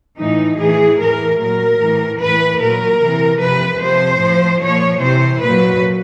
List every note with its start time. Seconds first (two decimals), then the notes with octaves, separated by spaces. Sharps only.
0.18 A2 E3 D#4
0.59 A2 E3 G#4
1.00 A2 E3 A#4
1.39 A#2 F#3 A#4
1.80 A2 E3
2.19 A2 E3 B4
2.60 A#2 F#3 A#4
2.99 C3 E3
3.40 C3 F3 B4
3.80 C3 F3 C5
4.20 A2 F3
4.61 A#2 F3 C#5
5.00 C3 E3 C5
5.41 A#2 F#3 B4